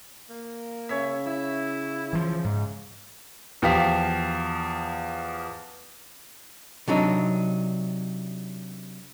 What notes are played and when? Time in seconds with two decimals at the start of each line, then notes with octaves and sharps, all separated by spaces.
0.29 A#3
0.89 C#3 C#5 E5
1.26 E4 E5
2.13 E3 F3
2.44 G#2
3.62 E2 F3 G4 F5 B6
6.88 C3 F#3 D4 D#4